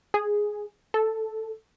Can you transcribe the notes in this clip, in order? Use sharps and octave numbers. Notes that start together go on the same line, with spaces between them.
G#4
A4